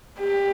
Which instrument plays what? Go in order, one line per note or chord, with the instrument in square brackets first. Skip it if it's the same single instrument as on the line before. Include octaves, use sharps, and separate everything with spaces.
[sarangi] G4